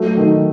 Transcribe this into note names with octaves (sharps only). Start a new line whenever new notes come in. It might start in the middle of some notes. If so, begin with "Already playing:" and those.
Already playing: F#3 A3
D#3